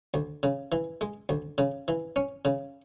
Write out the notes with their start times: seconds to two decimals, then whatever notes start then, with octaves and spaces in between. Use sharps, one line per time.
0.14 D2
0.43 C#3
0.72 E3
1.01 G#3
1.29 D2
1.58 C#3
1.88 E3
2.16 C#4
2.45 C#3